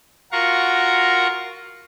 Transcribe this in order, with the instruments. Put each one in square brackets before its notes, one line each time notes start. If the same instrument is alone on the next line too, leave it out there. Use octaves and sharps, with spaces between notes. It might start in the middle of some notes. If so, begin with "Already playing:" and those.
[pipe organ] F4 F#4 A#4 F5 A#5 C#6